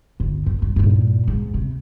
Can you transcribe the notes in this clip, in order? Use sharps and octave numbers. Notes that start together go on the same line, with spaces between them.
G1
F#2
G2
G2 A#2
G#2
C3